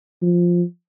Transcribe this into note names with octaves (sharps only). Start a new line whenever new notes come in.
F3